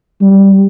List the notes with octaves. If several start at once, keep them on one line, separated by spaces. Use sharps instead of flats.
G3